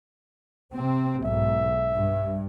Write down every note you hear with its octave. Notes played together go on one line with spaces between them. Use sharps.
C3 C4
B1 G#2 E5
G2